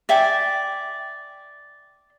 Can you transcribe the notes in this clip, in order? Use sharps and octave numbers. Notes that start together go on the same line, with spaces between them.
D5 E5 G5 G#5